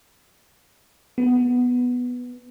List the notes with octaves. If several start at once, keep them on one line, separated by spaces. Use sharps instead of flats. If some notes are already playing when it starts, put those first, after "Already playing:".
B3